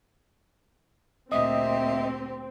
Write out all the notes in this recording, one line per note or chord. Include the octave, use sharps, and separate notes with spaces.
D2 A#2 C4 G4 D#5 E5 D#6